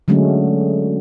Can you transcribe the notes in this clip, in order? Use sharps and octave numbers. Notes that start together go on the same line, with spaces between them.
D3 F#3 G#3 A3 C#4